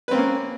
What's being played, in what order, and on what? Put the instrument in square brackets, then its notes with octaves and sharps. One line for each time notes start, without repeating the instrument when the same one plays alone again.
[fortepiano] B4
C4
A#3
C#4